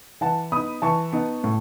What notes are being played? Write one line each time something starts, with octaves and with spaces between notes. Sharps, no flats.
E3 F#5 A5
B3 D#4 B5 D#6
E3 A5 C#6
B3 D#4
A2